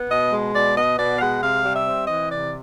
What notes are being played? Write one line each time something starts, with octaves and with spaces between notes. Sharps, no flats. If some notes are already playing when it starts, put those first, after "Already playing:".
Already playing: B3
B2 D#5
G#3
B2 D5
B3 D#5
B2 D5
F5
G#3 F#5
C3 F5
G3
E5
C4
E3 D#5
C3 D5